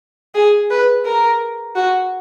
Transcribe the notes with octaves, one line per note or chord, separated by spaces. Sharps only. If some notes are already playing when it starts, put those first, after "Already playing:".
G#4
B4
A#4
F#4